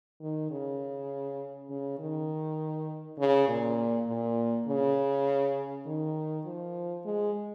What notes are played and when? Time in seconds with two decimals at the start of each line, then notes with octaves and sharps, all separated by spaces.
0.21 D#3
0.51 C#3
1.69 C#3
1.99 D#3
3.19 C#3
3.48 A#2
4.07 A#2
4.67 C#3
5.86 D#3
6.45 F3
7.05 G#3